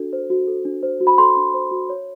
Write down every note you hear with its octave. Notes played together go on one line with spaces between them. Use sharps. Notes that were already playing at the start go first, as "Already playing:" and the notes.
Already playing: D4 F#4 A4
C5
F#4
A4
D4
C5
F#4
B5
A4 C6
D4
C5
F#4
C#5